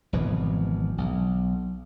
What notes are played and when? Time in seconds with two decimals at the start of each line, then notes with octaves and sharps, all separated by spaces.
0.13 G#1 B2 E3 F3
0.98 B1